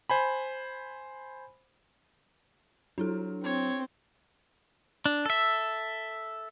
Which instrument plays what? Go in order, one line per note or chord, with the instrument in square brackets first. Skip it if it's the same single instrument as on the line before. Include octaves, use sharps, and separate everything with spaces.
[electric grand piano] C5 G#5 B5
[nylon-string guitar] F#3 [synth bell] D4 E4 A4
[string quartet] C4 [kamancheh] C#5
[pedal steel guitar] D4
A4 E5